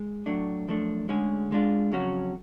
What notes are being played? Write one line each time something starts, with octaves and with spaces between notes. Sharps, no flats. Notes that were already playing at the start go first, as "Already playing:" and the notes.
Already playing: G#3
A2 F#3 A3 D4
F#2 F3 A3 D4
D2 D3 G#3 C#4 G#4
G#2 G#3 D4 F4
F2 C#3 F#3 C#4 F#4